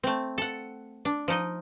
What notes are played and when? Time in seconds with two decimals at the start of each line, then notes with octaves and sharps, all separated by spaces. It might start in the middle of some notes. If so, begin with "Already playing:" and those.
0.03 A3 C4
0.38 A4 F#5
1.05 D4
1.28 F3 D#4 D#5